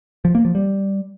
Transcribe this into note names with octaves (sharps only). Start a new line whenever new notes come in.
F3
A#3
F3
G3